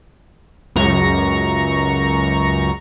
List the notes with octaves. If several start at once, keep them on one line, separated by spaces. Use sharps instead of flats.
C#2 F#2 A#5 C#6